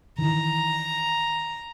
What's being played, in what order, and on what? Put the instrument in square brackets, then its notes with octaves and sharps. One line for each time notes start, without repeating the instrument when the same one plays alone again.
[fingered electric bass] D#3 E3 [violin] A#5